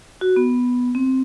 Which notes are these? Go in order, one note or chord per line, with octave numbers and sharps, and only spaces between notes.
F#4
B3
C4